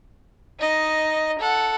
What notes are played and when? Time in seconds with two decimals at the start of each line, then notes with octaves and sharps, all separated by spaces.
0.59 D#4 D#5
1.39 A4 F#5